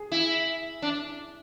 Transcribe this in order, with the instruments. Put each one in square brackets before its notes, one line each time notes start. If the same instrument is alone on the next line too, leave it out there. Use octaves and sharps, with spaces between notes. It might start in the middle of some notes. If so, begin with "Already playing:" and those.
Already playing: [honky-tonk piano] G#4
[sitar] E4
D4